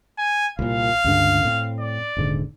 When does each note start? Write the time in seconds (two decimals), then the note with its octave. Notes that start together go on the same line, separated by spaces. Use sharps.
0.18 G#5
0.59 C2 A#2 F5
1.04 C#2 G2 D3
1.45 A2 C4
1.79 D5
2.17 D#1 G#2 D3